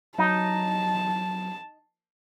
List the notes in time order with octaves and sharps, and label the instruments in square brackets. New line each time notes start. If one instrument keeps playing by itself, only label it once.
[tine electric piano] F#3 [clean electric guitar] D#4 [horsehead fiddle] A5